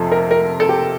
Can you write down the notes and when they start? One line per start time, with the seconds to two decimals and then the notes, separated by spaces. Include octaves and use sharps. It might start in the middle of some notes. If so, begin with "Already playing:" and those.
Already playing: F2 C3 F3 A4
0.12 A#4
0.31 A#4
0.60 A4
0.69 G4